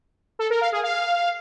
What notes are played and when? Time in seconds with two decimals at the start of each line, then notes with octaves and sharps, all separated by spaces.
0.39 A4
0.50 A#4
0.61 F5
0.72 G#4
0.83 F5